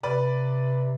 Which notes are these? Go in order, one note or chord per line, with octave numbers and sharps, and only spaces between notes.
C3 B4 D5